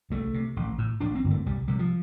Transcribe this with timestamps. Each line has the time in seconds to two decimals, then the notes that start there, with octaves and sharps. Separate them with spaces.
0.10 C2 A3
0.34 C3
0.56 A1
0.78 A2
1.01 A1 D4
1.15 C4
1.24 G2 D3
1.31 A3
1.46 C2 G3
1.68 C3 G3
1.79 F3